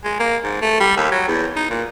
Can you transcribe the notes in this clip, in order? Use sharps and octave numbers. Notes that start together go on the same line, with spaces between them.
G#3
A#3
G#2
A3
G3
D#2
F#3
E2
D#4
A#2